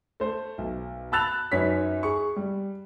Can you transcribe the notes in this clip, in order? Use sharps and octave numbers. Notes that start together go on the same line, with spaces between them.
A3 C5
B1
A5 B5 E6 F#6 A6 F7
F#2 D#4 B4 C#5 B6
G#4 C#6
G3